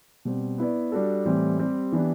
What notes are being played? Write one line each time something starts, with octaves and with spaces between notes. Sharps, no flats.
B2 G3 C4
B3 E4 B4 D5
G3 D4 F#4 A4
A2 E3 G3 C4
G3 C4 G4 D5
E3 B3 D4 G4